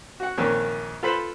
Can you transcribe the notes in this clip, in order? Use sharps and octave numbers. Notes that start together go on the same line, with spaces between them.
F#4 F#5
A#1 F2 D#3 A#3 C#4
F4 A4 B4 C5 B5